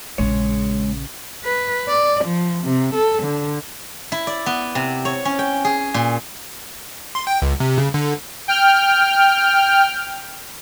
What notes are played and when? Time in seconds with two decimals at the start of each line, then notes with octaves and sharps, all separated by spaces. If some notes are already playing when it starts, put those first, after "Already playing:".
0.18 A#1 C#3 G#3 C#5
1.44 B4
1.89 D5
2.25 F3
2.65 C3
2.94 A4
3.23 D3
4.12 E4
4.27 D5
4.46 B3
4.75 C3
5.05 C#5
5.25 C#4
5.39 G5
5.65 G#4
5.94 A#2
7.15 C6
7.27 G5
7.42 C#2
7.60 C3
7.78 C#3
7.94 D3
8.48 G5 F6